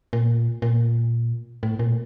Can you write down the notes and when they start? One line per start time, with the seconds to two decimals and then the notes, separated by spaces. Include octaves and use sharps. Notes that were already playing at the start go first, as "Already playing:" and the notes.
0.13 A#2
0.62 A#2
1.63 A2
1.79 A#2